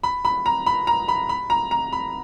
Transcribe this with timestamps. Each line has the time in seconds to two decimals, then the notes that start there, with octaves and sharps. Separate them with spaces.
0.03 B5
0.25 B5
0.46 A#5
0.66 B5
0.87 A#5
1.08 B5
1.29 B5
1.50 A#5
1.71 A#5
1.93 B5